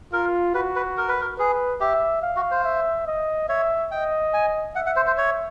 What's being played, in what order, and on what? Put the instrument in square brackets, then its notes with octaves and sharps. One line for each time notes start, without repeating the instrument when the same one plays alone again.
[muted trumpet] F4 [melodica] A#4
[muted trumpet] F#4 [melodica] B4
[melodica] B4
A#4
B4
A#4
[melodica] G#4 [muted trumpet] B4
[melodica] G4 [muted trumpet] E5
[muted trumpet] F5
[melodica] F#4
C5
[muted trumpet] E5
D#5
[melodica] C#5 [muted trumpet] E5
[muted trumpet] D#5 [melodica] G5
[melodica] G#5
[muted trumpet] E5 [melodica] F#5
[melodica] F#5
C5
C5
C#5